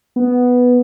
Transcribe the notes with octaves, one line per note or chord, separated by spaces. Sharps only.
B3